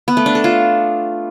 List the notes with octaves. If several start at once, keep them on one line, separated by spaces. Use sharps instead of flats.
B3
A3
D4
A4
F4